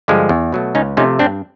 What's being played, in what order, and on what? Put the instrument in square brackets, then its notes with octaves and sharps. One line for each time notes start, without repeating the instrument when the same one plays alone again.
[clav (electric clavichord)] G2 D3 F3 G#3
E2
B2 F#3 A3
C#2 C#4 D#4
C3 F3 A3 C#4 D#4
G2 C4 D4